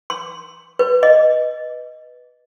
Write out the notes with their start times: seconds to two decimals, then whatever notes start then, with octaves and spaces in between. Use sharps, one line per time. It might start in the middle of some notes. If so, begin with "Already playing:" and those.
0.10 C6
0.79 B4
1.03 D#5